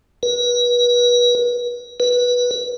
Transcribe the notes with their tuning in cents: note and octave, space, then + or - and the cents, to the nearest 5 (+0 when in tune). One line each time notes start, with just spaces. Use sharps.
B4 -35
B4 -15